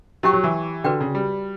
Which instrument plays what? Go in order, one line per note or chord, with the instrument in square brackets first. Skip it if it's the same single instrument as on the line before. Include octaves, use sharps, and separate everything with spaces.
[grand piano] F#3 [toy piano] E4 G4 C#5 G5 C#6
[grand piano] F#3
E3
[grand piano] D3 [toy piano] F#4 B4 D5 G5
[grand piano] C#3
G3